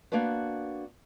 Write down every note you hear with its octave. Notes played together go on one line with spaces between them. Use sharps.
A#3 B3 D4 F#4 B4